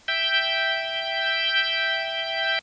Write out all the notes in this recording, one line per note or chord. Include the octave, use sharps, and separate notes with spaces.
E5 G5 G6